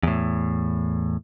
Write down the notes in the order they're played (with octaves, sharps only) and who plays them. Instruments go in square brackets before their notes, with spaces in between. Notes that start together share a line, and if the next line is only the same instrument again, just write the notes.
[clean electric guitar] E2 A2